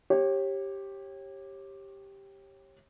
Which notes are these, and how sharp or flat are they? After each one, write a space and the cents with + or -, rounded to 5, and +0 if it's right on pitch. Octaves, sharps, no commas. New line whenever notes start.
G4 +0 C#5 -30